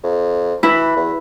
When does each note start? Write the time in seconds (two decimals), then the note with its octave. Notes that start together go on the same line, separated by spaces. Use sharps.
0.03 F2
0.63 E3 E4 B4
0.96 E2